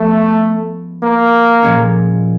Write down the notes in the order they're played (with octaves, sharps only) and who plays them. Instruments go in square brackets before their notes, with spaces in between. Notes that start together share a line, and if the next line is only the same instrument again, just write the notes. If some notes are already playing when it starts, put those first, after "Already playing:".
Already playing: [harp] F3 G#3 B3 [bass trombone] A3
[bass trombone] A#3
[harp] A#2 F3 G#3 C#4